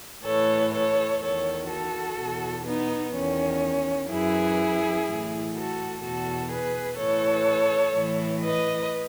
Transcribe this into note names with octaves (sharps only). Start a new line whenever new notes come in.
A2 E3 A4 C#5
A4 C#5
E2 D#3 A4 C#5
F#4 A4
E2 B2
B3 D#4
E2 D#3 C#4
F#2 E3 E4 G#4
A2 E3
F#4 A4
E2 B2 F#4 A4
G#4 B4
A2 E3 A4 C#5
A2 E3
B4 D#5